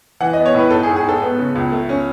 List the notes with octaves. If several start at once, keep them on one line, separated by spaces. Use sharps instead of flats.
E3 F#5
D#5
B3
C#5
A2 B4
G#2 A4
G#4
G#2
G#4
G#2 A4
B3
C#3
C#2
A3
C#4